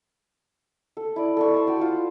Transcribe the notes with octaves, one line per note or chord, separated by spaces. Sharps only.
A4
E4 D5
A4 D5 C#6
A5 C6
F#4 G5
F4